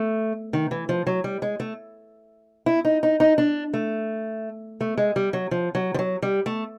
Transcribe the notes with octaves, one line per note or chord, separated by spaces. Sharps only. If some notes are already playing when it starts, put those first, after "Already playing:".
Already playing: A3
D#3
E3
F3
F#3
G3
G#3
A3
E4
D#4
D#4
D#4
D4
A3
A3
G#3
G3
F#3
F3
F#3
F3
F#3
G3
A3